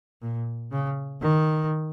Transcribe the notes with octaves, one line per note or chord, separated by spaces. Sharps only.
A#2
C#3
D#3